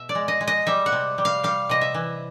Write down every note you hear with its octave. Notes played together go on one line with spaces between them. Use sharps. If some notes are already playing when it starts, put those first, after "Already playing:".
Already playing: B2 E5
D5
G#3
D#5
G#3
D#5
G3 E5
F#5
C3
G3
F5
G3 F5
C3 D#5
E5
E3